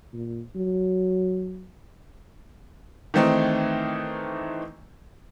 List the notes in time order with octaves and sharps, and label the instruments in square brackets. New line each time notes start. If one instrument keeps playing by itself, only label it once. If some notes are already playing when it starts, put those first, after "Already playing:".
[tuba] A#2
F#3
[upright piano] D#3 E3 A3 C4 D#4